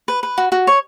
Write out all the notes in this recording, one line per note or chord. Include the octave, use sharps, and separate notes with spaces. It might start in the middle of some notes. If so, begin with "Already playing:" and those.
B4
B4
F#4
F#4
C#5